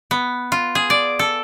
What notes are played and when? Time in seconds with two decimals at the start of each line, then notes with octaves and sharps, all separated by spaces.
0.11 B3
0.52 F4
0.75 G#4
0.90 D5
1.19 A4